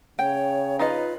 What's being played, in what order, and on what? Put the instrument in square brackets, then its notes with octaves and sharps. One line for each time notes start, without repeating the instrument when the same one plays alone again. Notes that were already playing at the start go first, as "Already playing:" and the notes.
[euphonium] C#3 [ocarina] C#5 [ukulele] G5
[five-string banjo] D#4 F4 D#5 [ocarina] B4